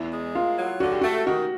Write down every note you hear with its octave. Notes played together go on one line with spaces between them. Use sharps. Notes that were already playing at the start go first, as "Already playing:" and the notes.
Already playing: E2 E4
G#3
A#3 F4
F#3
D3 F#4
G4
A3 F#4
D#3 F#4